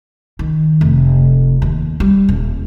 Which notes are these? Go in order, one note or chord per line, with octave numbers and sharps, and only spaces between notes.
D#3
F1
D#2
G3
D#1